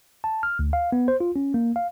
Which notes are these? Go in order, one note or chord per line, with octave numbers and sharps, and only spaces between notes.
A5
F6
D2
F5
B3
C5
F4
C#4
A#3
F5